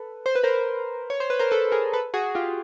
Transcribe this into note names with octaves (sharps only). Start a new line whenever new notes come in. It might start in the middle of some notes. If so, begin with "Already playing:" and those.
Already playing: A4 B4
C5
B4
A#4 C5
C#5
C5
B4
A#4 C5
A4 B4
G#4 A#4
A4 B4
F#4 G#4
F4 G4